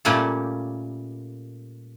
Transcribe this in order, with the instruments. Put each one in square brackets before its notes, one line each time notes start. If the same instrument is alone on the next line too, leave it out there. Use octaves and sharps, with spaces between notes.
[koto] A#2 G3 A3 A#3 C#4 A4